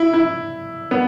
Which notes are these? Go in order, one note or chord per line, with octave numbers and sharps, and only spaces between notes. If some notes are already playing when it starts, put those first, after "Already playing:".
Already playing: E4
E4
B3